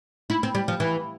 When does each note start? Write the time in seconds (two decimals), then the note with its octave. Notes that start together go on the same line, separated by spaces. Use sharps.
0.30 E4
0.43 C4
0.55 G3
0.68 F3
0.80 E3